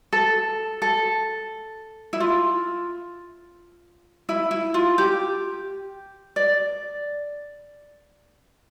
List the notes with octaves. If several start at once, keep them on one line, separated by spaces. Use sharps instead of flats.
A4
A4
E4
F4
E4
E4
F4
G4
D5